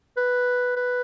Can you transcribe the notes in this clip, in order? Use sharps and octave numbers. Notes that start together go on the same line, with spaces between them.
B4
B4